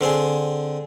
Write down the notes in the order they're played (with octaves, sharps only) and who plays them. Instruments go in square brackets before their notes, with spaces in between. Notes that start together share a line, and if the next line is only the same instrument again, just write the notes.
[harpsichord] D3 C4 G#4